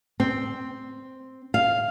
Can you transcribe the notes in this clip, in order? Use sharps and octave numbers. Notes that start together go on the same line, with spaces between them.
C4
F5